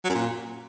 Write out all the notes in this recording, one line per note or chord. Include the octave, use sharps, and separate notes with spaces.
F#3
F#2
A#2